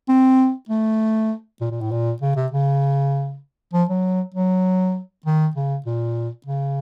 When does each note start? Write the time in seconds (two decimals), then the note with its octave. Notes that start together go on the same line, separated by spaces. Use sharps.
0.09 C4
0.69 A3
1.61 A#2
1.71 A#2
1.81 A2
1.91 A#2
2.22 C#3
2.36 C3
2.52 C#3
3.73 F3
3.89 F#3
4.35 F#3
5.26 D#3
5.56 C#3
5.86 A#2
6.47 C#3